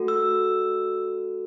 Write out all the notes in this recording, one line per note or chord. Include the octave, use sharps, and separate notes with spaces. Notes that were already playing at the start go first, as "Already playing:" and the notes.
Already playing: A3 F#4 A4
E6